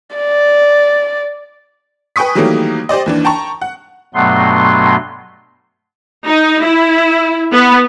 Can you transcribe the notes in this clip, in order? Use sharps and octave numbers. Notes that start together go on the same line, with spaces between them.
D5
B4 G5 G#5 C#6 D#6 B6
D#3 E3 F#3 G3 A3 A#3
G4 C5 D5 D#5
D#2 E3 D4
G5 A5 A#5 C#6
F#5
G2 B2 F#3 A3 B3 C6
D#4
E4
B3